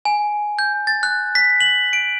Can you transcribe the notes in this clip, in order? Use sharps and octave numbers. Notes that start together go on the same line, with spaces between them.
G#5
G6
A6
F#6
B6
F#7
D7